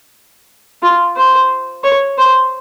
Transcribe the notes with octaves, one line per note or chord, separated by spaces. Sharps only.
F4
C5
C#5
C5